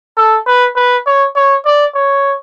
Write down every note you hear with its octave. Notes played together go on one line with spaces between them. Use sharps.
A4
B4
B4
C#5
C#5
D5
C#5